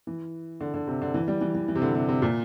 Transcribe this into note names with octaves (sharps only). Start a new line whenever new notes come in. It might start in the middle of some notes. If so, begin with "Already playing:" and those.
E3
D3
D3
C3
D3
E3
G3
E3
E3
E3
C3
D3
C3
C3
A#2